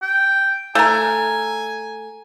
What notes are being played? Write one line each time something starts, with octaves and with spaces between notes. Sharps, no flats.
G5
A3 A#4 G#5